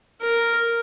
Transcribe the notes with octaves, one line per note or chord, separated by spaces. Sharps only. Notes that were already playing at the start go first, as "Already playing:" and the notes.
A#4